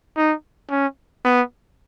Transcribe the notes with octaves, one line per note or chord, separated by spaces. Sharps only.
D#4
C#4
B3